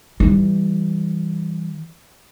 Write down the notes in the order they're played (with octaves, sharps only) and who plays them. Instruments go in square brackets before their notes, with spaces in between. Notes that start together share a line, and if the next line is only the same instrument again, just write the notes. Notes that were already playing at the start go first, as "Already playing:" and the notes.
[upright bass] E3 G3